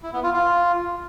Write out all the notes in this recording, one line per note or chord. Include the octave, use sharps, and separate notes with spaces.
E4
B3
F4
F4